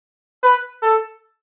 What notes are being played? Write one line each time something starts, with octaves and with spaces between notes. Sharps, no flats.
B4
A4